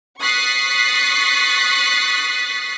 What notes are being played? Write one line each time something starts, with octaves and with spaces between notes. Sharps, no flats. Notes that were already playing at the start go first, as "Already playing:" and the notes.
C#6 D#6 F#6 A6 B6 C7